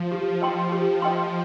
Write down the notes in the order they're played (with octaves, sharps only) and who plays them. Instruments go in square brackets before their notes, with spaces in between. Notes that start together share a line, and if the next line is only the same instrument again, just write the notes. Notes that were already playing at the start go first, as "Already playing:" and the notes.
Already playing: [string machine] F3
[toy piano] G4
D#5 G5 C6
[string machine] F3 [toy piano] G4
[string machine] F3 [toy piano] D#5 G5 C6